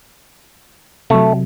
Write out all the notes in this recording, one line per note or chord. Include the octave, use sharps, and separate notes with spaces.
C3 F#3 A3